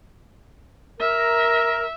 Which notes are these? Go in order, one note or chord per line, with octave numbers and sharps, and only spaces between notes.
A#4 E5